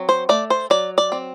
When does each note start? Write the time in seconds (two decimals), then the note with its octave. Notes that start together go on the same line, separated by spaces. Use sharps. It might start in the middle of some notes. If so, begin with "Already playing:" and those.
Already playing: F#3 C4
0.09 C5
0.29 A3 D5
0.50 C5
0.70 F#3 D5
0.98 D5
1.12 C4